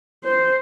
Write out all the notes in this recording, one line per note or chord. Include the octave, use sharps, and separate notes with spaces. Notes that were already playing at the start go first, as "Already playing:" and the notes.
C5